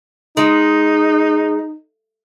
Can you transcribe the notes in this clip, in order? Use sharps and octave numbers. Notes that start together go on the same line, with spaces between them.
G#3 D#4